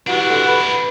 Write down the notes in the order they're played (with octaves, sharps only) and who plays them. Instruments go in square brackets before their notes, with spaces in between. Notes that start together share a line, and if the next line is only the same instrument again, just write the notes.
[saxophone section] E3 G3 F#4 [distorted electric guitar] D4 E4
[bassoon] D3
B4